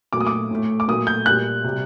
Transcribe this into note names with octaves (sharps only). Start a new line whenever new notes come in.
A#2 F#3 A3 D6
D#6
D6
A2 A3
D6
A#2 F#3 A3 D#6
G6
A#2 G3 F#6
C3 G3